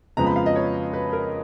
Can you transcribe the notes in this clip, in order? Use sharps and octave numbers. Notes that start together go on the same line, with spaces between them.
F2 C#3 F3 G#3 B3 A#5
B5
F5
D#5
C#5
B4
A#4